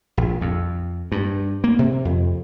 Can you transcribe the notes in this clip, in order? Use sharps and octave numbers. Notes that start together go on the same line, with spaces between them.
A#1
F2
G2
A#3
C3
F2